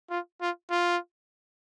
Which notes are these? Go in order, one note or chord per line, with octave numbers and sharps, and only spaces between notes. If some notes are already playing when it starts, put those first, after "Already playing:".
F4
F4
F4